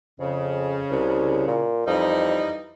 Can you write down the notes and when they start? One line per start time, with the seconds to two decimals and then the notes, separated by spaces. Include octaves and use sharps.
0.20 F2 C#3
0.91 C2
1.48 A#2
1.87 F2 E3 G3 D#4